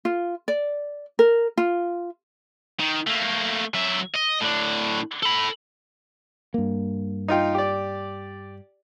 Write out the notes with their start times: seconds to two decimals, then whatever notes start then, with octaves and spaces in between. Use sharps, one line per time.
0.05 F4
0.48 D5
1.19 A#4
1.57 F4
2.80 D#3
3.07 A3 A#3
3.74 F#3 E5
4.16 D#5
4.42 A2 D4
5.23 A4 B5
6.54 G2 A#3
7.28 D#4 F4 G5
7.55 G4 D5